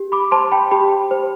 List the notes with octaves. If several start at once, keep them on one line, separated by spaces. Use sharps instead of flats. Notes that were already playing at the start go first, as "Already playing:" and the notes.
Already playing: G4
B5 D6
C5 A5 C6
G5 B5
G4 G5 B5
C5